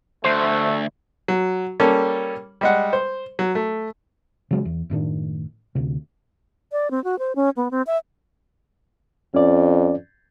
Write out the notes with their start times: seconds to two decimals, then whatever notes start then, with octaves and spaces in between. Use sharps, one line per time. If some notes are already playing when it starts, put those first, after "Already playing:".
0.24 D2 A3 C5
1.28 F#3
1.80 G3 A#3 C#4 A4
2.61 G3 G#3 F#5
2.93 C5
3.39 F#3
3.55 A3
4.51 C#3 F#3 G#3
4.65 E2
4.90 F#1 A2 D#3 D4
5.75 D2 C3
6.72 D5
6.91 C4
7.04 F#4
7.19 C5
7.36 C#4
7.57 B3
7.71 C4
7.87 E5
9.34 F2 C#4 D5